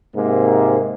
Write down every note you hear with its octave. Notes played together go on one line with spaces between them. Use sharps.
G#2 C3 A#3